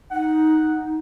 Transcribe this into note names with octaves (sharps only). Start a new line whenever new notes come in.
D#4 F#5